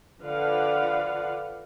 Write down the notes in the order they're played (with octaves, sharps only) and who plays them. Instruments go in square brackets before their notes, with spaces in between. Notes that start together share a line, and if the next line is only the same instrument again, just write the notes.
[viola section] D3 F3 B4 D5 F5 F#5